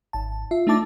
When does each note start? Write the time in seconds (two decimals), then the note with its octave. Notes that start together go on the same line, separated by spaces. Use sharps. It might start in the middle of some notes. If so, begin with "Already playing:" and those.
0.13 G#1 A5
0.51 F4 E5
0.67 A3 D4 D#4 A5 D6 A6